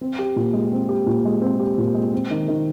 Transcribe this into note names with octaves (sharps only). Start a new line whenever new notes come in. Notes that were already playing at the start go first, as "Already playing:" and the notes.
C4
G4
A#2
G#3
C4
G4
A#2
G#3
C4
G4
A#2
G#3
C4
D#3
D#3